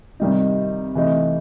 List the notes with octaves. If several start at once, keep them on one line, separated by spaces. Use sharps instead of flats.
C3 D#3 G3 D#4
C3 E3 A3 D#4